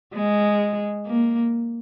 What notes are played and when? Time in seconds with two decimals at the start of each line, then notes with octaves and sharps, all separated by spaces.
0.13 G#3
1.06 A#3